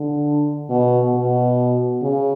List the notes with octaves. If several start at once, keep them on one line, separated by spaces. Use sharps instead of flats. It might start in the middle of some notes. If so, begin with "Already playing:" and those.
Already playing: D3
B2
B2
C#3